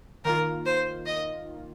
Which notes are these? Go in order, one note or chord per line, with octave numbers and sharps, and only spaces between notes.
D#3 A#3 F4 A#4
C5
D#5